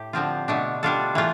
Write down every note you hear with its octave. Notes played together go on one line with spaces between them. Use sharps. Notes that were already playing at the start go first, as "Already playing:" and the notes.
Already playing: A2 G4
D3 F3 C4 F4
B2 A3 D4
G3 D4 F4 A4
E3 A3 F4